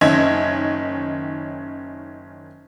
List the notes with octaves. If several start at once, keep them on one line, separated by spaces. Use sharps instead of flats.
F#1 D#3 C#4 D#5 E5 G#6